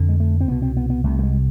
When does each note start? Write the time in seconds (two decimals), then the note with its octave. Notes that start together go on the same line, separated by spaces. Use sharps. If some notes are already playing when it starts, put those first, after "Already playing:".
Already playing: F2 D3
0.09 G#3
0.20 A3
0.41 C4
0.48 C2 B2 B3
0.62 C4
0.77 B3
0.90 B3
1.04 C2 C3 A3
1.19 A3
1.23 G#3